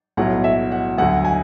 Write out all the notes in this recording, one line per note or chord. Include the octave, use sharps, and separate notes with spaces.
B1 A2 F#3 F#5
E5
F#5
D2 D3 F#3 F#5
G#5